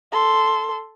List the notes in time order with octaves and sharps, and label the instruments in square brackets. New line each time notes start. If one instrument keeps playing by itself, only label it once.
[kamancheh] A4 C6